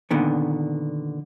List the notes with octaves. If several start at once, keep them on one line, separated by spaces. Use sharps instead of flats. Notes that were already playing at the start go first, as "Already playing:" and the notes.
A#2 D3 D#3 B3